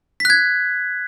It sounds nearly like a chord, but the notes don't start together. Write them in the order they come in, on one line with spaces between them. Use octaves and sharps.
B6 F#6 G#6